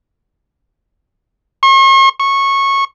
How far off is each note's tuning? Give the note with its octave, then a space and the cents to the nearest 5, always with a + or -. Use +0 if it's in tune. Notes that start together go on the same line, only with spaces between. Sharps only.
C#6 -45
C#6 -15